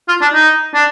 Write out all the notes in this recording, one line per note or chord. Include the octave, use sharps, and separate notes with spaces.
F4
D4
D#4
D4